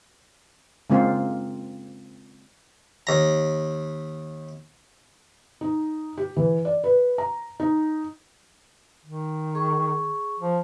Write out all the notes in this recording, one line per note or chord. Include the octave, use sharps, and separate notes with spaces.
C#3 G#3 A#3 C4 F4
D#2 A#5
D#4
G4
E3
D5
B4
A#5
D#4
D#3
G#4 C#6
F3